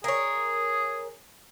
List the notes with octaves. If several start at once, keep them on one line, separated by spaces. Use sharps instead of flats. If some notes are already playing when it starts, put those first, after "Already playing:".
G#4 A#4 C#5